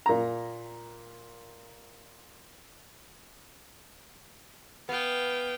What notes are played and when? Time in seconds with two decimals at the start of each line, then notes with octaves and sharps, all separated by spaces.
0.06 A#2 A#5
4.89 B3 F5 G5